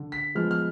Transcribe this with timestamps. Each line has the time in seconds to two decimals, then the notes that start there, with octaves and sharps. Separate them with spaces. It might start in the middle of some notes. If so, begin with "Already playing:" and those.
Already playing: D3
0.12 B6
0.35 F3 G#3 B3 F6
0.51 F6